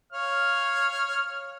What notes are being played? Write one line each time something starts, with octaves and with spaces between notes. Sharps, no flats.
C#5 F5 F6